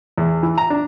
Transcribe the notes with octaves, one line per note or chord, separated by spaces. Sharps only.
E2
E3
A#5
D4